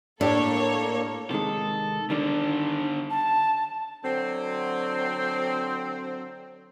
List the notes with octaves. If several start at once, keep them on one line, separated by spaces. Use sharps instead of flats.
A2 A#3 D4 G4 A4 C#5
C3 D#3 G#3 A4
D3 D#3 G3 D4
A5
D3 F#3 C4